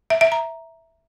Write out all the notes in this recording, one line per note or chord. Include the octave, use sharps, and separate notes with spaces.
E5
E5
A#5